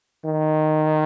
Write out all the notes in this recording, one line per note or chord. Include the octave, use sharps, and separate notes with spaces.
D#3